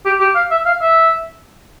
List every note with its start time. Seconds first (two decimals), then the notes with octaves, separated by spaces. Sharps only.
0.06 G4
0.21 G4
0.35 F5
0.51 E5
0.66 F5
0.82 E5